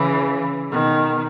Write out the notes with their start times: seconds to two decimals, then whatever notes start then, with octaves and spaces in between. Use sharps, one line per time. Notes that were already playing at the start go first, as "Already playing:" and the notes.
Already playing: C#3 E3
0.71 B2 D#3